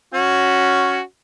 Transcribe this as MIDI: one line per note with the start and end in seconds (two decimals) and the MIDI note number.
0.14 1.01 61
0.14 1.01 66